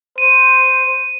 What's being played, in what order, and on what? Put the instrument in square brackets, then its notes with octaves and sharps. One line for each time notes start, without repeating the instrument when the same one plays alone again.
[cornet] C5 [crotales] D#7